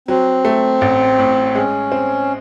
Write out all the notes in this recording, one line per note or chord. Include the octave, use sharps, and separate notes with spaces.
F#3 C4
A3
A1
A2
G#3 C#4
C4